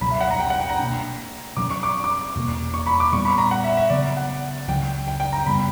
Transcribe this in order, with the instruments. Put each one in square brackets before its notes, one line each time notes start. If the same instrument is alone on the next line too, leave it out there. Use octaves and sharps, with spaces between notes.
[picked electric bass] C#2 B2 F#3 [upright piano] B5
[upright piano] E5
F#5
A#5
G5
F#5
G5
A#5
[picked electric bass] B2 A#3 D4
[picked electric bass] B2 F#3 C#4 [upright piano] D6
[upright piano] C#6
D6
D6
[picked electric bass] E2 B2 A#3
[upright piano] C#6
B5
D6
[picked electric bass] A#2 G3 B3 [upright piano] C#6
[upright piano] B5
A#5
F#5
E5
E5
[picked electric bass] C#3 F#3 B3 [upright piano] D5
[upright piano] F#5
[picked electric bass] C#2 C#3 F#3 [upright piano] G5
[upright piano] G5
G5
A#5
[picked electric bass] F#2 C#3 G3 B3 [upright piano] B5